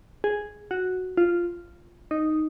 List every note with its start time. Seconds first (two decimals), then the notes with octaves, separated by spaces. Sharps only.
0.24 G#4
0.71 F#4
1.17 F4
2.11 D#4